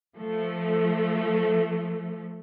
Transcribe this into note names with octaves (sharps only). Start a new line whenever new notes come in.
F3 A3